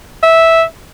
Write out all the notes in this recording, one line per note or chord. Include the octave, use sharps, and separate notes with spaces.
E5